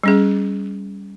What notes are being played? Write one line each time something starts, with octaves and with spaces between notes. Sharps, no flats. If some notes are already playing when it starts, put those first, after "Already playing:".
G3 C#4 G#4